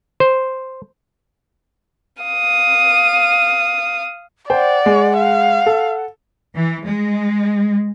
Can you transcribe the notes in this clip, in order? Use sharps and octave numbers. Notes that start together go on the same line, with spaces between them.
C5
F5 D#6
C5 D5 F#5 G5
G#3
F5
A4
E3
G#3